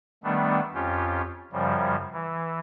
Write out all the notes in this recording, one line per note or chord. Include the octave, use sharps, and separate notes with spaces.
D#3 G3 A3 B3 D4
F2 C#4 F4 G4
F#2 C#3 F3 G3
E3